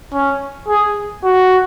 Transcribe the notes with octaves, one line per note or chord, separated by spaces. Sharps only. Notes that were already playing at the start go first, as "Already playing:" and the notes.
C#4
G#4
F#4